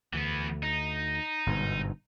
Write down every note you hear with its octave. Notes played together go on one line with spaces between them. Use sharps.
D2 E3 B3
D#4
G1 G#2 B2